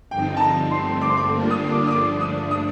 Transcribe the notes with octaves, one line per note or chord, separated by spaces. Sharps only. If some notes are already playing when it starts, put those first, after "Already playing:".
G2 D3 F3 C4 D#4 G5
A5
A#5
G2 D3 A3 C4 C6
D6
C6
D6
D3 G3 A#3 D4 F4
D#6
D6
D#6
G2 D3 F3 A3 D4 D6
D#6
D#6